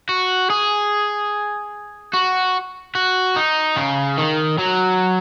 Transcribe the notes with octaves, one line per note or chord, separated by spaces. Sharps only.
F#4
G#4
F#4
F#4
D#4
C#3
D#3
F#3